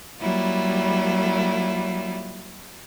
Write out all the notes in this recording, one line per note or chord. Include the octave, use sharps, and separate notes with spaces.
F#3 G3 A#3 E4 F4